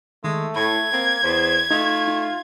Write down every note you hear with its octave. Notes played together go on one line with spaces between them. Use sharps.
D#3 G#3 A3
A2 B5 G#6
A#3 C4
E2 C5
A3 D#4 F4
D#4